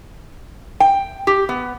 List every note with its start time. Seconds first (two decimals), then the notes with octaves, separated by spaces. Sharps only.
0.80 G5
1.27 G4
1.49 B3